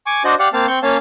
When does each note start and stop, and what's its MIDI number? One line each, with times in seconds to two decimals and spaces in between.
0.06 0.23 80
0.06 0.23 85
0.06 0.23 86
0.24 0.35 62
0.24 0.35 66
0.24 0.35 72
0.24 0.35 74
0.24 0.35 75
0.39 0.48 67
0.39 0.48 74
0.39 0.48 77
0.39 0.48 78
0.53 0.66 58
0.53 0.66 60
0.53 0.66 77
0.53 0.66 81
0.68 0.79 60
0.68 0.79 85
0.68 0.79 91
0.83 0.97 58
0.83 0.97 61
0.83 0.97 73
0.83 0.97 77
0.83 0.97 81